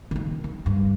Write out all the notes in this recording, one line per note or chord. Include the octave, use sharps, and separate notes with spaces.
D#3 A#3
D#3
G2